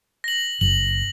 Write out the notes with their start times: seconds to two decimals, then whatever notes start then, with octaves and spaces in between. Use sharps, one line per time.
0.24 A#6 F#7
0.61 F#1 F#7